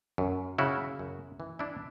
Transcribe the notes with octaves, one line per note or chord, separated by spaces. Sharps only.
F#2
C#3 E4 F#4
F#2
E3
D4 E4